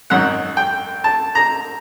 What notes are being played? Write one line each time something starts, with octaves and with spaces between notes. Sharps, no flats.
G#1 F#2 D#3 F#5
G5
A5
A#5